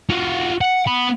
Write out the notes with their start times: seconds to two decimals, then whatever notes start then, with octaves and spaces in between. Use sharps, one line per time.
0.09 F4 F#4
0.61 F#5
0.87 B3 B5